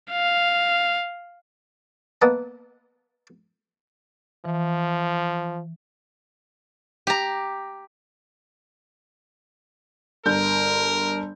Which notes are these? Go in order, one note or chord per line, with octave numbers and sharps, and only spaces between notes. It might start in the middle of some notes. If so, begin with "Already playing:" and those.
F5
A#3 B3 D#5 F#5 A5
E3 F3
G4 A#5
G1 A#4 G6